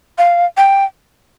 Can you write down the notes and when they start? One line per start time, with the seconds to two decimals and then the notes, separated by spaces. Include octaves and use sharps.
0.18 F5
0.57 G5